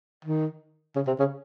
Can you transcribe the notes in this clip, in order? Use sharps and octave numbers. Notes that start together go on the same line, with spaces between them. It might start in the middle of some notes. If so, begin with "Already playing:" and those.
D#3
C#3
C3
C#3